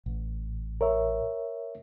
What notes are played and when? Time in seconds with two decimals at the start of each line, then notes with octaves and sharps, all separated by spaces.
0.06 A1
0.81 A#4 C#5 E5